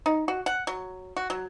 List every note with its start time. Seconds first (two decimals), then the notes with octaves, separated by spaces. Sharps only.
0.06 D#4
0.28 F#4
0.46 F#5
0.67 F#3
1.17 F#4
1.30 F#3